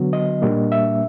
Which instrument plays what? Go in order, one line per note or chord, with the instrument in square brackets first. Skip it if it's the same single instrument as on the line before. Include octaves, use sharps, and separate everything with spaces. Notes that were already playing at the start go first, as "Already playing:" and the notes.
Already playing: [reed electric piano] D3 F#3 B3
D#5
A#2 G3 A#3 D4
E5